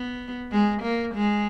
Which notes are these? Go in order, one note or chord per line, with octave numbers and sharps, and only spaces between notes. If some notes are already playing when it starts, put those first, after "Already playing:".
Already playing: B3
G#3
A#3
G#3